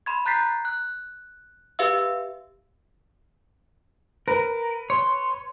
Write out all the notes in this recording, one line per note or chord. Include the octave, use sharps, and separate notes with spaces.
B5 C6 G#6
A#5 F#6 G6 A6 B6 C7
F#6
G4 B4 E5 F5 E6
A#4 B4
C#5 C6